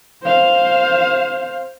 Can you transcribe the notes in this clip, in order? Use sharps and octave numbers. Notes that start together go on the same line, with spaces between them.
C5 F5